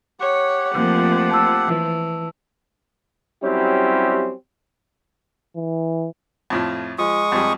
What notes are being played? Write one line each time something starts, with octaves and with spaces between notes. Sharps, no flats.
G4 C#5 F#5
F2 F3 A3 A#3
A5 E6
E3
F#3 G3 C4 C#4 E4 G4
E3
F2 A2 F4
F3 G#3 C#6 D#6
F2 G3